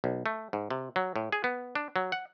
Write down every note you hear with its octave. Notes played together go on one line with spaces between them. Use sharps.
B1
A3
G#2
C3
F#3
A2
G#4
B3
D4
F#3
F#5